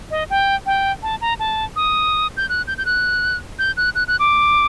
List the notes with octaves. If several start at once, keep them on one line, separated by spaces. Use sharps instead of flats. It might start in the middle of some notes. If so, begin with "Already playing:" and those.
D#5
G5
G5
A5
A#5
A5
D#6
G6
F#6
G6
G6
F#6
G6
F#6
F#6
F#6
D6